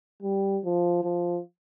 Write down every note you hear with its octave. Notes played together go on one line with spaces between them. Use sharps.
G3
F3
F3